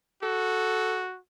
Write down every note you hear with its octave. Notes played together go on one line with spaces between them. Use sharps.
F#4 A4